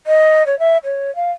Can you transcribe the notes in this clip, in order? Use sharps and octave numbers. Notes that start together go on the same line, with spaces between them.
D#5
C#5
E5
C#5
F5